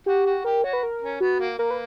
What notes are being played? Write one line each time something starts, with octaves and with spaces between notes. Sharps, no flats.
F#4 G4
F#4
G4 A#4
F#4 C#5
B4
A#4
C#4
B3 F#4
A#3
A#3 A#4
B4